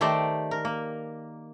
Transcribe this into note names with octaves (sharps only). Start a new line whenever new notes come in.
D#3 A3 G4 C5 D5 A#5
A#4
A#3